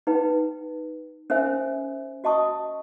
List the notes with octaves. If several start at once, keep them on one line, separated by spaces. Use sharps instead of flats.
D#4 B4 G5
C#4 A#4 C5 E5 G#5
F#4 D#5 A5 C#6 D#6